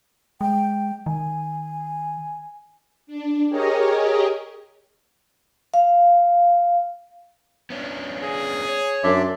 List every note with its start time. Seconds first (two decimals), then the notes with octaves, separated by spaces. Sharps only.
0.41 G#3 G5
1.06 D#3 G#5
3.07 D4
3.49 G4 G#4 A#4 C#5 D#5
5.74 F5
7.70 B3 C#4 D4
8.22 G#4
8.69 C#5
9.04 F#2 D4 D5 E5 C6